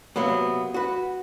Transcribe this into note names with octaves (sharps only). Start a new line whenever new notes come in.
C3 F#3 A#3 B3
F#4 B4